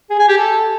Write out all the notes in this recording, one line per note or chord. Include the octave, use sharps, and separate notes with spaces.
G#4
G#5
G4
A4